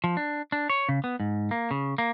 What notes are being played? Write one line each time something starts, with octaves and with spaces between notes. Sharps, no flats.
F3
D4
D4
C#5
C#3
B3
G#2
A#3
C#3
A#3